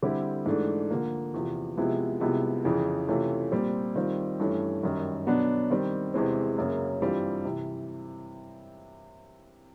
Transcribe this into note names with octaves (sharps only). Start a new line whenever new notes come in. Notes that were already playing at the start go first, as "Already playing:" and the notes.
D3 G3 C4 E4 G4
G#2 E3 A3 D4
D3 F3 A#3
E2 C3 F3
C3 F3 G#3 B3 E4
C2 C3 F3 G#3 B3
F2 C#3 E3
C3 E3 A3 C#4 F4
A#2 G3 C4
D#3 G3 C4 F4
G2 E3 A3 C#4
F#2 D#3 G3
B2 F#3 B3 D4
D#3 G3 C4
E2 C3 E3 G#3 C4
F#2 C#3 F#3 A#3 C#4
G2 E3 G3 C4 F4
C3 E3